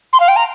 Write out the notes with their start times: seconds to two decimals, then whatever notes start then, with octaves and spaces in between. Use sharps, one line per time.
0.13 C6
0.20 F5
0.28 G5
0.36 A#5